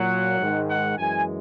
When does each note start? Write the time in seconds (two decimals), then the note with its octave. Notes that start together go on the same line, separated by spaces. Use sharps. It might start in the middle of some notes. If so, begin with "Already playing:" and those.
Already playing: A#2 F#3 F#5
0.40 G#2 D#3 G#3
0.70 F#5
0.97 F#2 E3 G#3 G#5